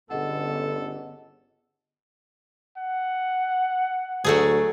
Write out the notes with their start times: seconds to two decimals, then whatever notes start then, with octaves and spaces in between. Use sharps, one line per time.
0.10 G1 D3 B3 C#4 G#4 A4 D#5 F#5
2.78 F#5
4.24 D2 F#3 A3 G#4